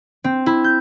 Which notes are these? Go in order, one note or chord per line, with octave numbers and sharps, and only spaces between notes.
C4
E4
G6